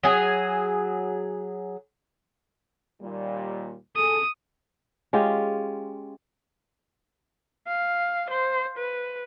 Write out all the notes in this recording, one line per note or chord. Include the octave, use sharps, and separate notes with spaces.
F#3 G#4
D#2 A#2 G3
G#4 A4 D#6
G#3 C#4 F4 G4
F5
C5
B4